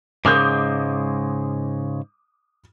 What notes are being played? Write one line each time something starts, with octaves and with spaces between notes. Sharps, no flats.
G#2 C#3 G#3 D6 D#6 G6